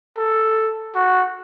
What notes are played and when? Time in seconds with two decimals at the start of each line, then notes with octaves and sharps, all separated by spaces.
0.17 A4
0.95 F#4